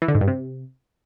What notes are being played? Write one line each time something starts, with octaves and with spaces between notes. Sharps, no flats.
E3
D3
G#2
G2
C3